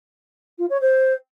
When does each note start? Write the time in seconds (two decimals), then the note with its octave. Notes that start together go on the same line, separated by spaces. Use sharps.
0.58 F4
0.70 C#5
0.81 C5